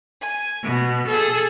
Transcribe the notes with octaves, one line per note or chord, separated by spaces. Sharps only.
G#5
B2
G#4 A4